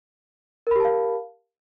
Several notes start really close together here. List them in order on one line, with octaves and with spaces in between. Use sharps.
A#4 B5 G4 A5 F5